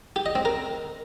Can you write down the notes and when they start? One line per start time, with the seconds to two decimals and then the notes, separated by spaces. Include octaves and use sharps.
0.16 G4
0.26 D#5
0.35 C4
0.45 A#4